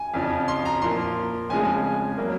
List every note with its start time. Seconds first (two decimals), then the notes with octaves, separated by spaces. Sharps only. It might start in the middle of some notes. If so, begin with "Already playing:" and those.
Already playing: G#5
0.14 F2 C#3 F3
0.48 C6
0.65 A#5
0.82 A#2 F3 A#3 C6
1.50 F2 C#3 F3 G#3 G#5
2.18 C#3 F#3 A#3